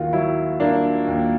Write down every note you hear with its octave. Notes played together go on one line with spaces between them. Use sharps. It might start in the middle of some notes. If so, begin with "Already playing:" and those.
Already playing: D#2 D#3 F4 F#4
F#3 E4
A#3 D4
D#2